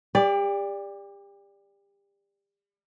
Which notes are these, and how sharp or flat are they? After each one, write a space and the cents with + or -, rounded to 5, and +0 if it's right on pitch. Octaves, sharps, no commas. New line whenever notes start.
G4 +35 D5 +0